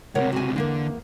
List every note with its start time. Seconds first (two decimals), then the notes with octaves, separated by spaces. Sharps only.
0.15 C#2 C3 A#4 C#5 F#5
0.32 F#4 G#5
0.56 E2 D3 A#3 A#4